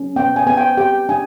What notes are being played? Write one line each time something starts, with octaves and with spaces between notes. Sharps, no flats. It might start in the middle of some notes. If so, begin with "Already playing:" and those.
Already playing: C#4
B3 G5
G#5
B3 G#5
G5
G4 G5
D4 G#5